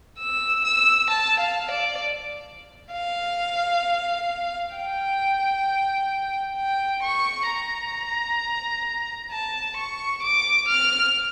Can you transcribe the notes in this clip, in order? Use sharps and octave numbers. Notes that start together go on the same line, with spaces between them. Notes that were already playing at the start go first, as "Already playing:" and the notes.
E6
E6
A5
F5
D5
F5
G5
G5
C#6
A#5
A5
C#6
D6
F6